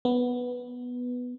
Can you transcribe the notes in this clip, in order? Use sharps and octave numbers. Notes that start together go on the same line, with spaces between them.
B3